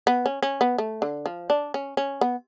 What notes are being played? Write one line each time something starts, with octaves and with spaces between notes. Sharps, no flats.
B3
C#4
C#4
B3
A3
D3
F3
D4
C#4
C#4
B3